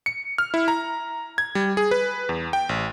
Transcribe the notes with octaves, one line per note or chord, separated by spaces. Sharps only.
C#7
F6
E4
A#5
G#6
G3
G#4
B4
E2
G5
A1